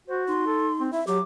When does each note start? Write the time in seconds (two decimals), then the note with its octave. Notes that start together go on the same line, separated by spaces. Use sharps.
0.08 F#4 C5
0.28 D#4 C6
0.47 A4
0.80 C4
0.92 E4 E5
1.07 F#3 G4 D6